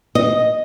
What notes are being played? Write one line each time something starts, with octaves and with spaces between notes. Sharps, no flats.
D#5